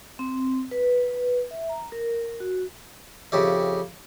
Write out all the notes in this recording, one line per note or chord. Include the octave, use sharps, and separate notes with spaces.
C4
B4
E5
A#5
A#4
F#4
F2 C#3 G4 E5